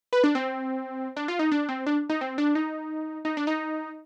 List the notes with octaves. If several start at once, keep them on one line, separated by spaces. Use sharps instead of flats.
B4
D4
C4
D4
F4
D#4
D4
C4
D4
D#4
C4
D4
D#4
D#4
D4
D#4